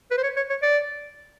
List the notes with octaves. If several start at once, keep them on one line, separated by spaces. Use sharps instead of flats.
B4
C5
C#5
C#5
C#5
D5